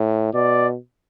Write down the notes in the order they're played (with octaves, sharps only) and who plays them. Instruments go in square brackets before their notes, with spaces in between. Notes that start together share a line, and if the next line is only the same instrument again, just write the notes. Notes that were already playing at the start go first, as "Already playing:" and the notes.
Already playing: [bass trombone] A2
[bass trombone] B2 [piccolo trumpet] D5